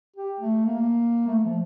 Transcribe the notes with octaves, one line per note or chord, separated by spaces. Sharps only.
G4
A3
A#3
A3
F3